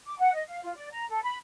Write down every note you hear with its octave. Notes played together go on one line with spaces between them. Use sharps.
D6
F#5
D#5
F5
F4
D5
A#5
A4
B5